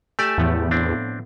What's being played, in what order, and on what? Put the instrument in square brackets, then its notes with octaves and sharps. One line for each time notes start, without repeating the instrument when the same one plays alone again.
[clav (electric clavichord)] A3 G4 D5 [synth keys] G#5 E7
[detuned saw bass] E2 [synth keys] A2 F3 B3
[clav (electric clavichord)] C4 D4